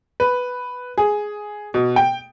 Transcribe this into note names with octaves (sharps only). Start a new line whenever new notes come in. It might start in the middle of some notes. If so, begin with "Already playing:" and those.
B4
G#4
B2
G5